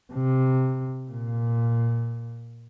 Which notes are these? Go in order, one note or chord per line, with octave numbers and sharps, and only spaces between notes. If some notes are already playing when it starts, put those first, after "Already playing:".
C3
A#2